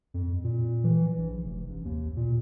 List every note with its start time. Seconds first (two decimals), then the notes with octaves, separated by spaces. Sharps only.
0.14 F2
0.44 A#2
0.84 E3
1.17 A#1
1.44 F1
1.70 A1
1.85 D#2
2.17 A#2